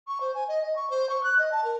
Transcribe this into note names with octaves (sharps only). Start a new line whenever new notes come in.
C#6
C5
G#5
D#5
D#5
C#6
C5
C#6
F#6
D#5
A5
A#4